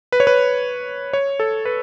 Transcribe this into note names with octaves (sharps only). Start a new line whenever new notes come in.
B4
C#5
B4
C#5
A4
B4